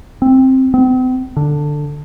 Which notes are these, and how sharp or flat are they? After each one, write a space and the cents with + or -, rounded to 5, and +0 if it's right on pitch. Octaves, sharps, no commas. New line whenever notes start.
C4 +5
C4 -40
D3 +10